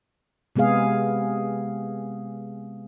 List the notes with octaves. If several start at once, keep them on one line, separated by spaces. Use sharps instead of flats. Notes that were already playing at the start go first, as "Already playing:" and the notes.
C3 G#3 B3 G#4 F5